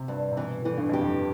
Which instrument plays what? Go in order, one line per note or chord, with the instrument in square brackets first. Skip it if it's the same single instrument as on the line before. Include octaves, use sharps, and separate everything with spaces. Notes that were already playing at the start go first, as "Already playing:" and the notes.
Already playing: [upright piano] C3
[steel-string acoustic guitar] G2
[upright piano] C3
[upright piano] B2 [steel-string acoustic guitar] E3
[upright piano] A2 [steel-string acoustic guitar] E3
[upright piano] G2
[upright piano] F2 [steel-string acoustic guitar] G4
[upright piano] G2